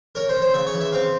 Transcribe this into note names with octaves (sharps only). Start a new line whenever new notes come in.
C#4 A#4
C5
C#4
C5
C#3 E5
C#5
E3
E5
C4 F5